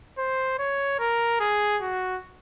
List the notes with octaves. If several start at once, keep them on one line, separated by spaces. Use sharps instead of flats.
C5
C#5
A#4
G#4
F#4